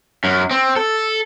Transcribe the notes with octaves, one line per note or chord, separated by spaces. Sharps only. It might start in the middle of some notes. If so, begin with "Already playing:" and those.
F#2
C4
A4